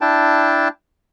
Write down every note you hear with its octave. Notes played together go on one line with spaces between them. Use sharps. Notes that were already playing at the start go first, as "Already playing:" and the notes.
D4 E4 G5 A5